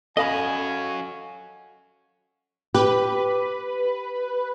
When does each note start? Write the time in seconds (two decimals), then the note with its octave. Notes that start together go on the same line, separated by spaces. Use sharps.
0.17 C#4 F#4 A4 D#5 F5 G#5 B5
2.74 G4 B4